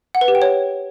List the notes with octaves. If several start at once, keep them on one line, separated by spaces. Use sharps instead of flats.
F#5
B4
G4
G5
C#5